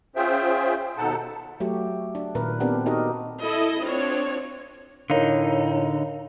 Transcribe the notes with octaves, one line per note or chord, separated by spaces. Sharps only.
C#4 F4 G#4 C5 E5 G5
D#2 B2 D#4 A4 F#5 A5
F#3 A3 F#4 G4
D4
A#2 D#3 A#3 A#4 B4
B3 C4 D4 G4 A#4
D#4 F#4 G4 A4 A#4 D#5
E4 A4 D#5
C4 D4 F4 C#5
A2 D3 D#4 A#4 C#5 F5